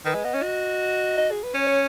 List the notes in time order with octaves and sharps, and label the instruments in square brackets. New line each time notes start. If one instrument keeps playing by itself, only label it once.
[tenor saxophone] D#3 [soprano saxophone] B4
[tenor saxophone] G#3
[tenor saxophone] B3 [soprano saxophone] D#5
[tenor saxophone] C#4
F#4
[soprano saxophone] D#5
G#4
B4
[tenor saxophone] C#4 [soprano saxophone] C#5
[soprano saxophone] C#5